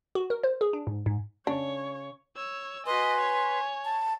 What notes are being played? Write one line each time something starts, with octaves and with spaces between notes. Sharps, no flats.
F#4
A#4
C5
G#4
D4
G#2
G#2
C#3 D4 C#5
C#5 E6
F#4 B4 D#5 G#5 C6
C#5
A5